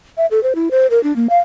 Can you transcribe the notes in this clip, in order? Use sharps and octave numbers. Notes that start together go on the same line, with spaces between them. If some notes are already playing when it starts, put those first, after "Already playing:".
E5
A4
C5
E4
C5
A#4
D4
A#3
F5